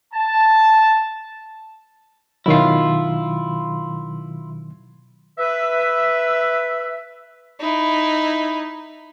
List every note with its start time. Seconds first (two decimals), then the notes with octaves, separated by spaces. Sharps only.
0.14 A5
2.46 B2 D#3 F#3 E4 F4
5.38 B4 E5
7.60 D#4 E4